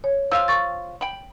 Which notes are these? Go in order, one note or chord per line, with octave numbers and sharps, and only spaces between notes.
C#5
F3 F4 F5 E6
C#6 A6
G5 B5